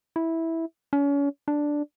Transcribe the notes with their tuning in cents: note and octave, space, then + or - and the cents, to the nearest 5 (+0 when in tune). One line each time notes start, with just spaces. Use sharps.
E4 -10
C#4 +35
D4 +0